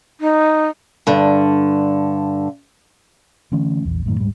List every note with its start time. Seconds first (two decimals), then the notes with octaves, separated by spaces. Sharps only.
0.21 D#4
1.07 G2 D3
3.52 D3 E3 A3 C#4
3.85 A#1 E2
4.06 F#2 A2 D#3
4.20 D1 G#2 G3